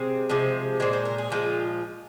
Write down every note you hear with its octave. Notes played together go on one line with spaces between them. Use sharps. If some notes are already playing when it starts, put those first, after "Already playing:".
Already playing: C3 G#3 C4
C3 F3 G#3
A#2 G#3 C4
C5
A#4
G#4
A#2 F3 G#3 F4